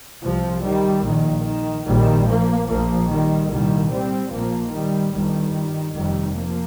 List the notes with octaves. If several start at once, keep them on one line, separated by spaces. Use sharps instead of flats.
C2 C3 F3
D#3 G3
A#1 A#2 D#3
D#3
A#1 A#2 D#3 G3
F3 A#3
A#1 A#2 F3 A#3
D#3 G3
C2 A#2 D#3 G3
G3 C4
A#1 A#2 F3 A#3
D#3 G3
G1 G2 D#3 G3
F1 F2 C3 D#3 G3
F3 A#3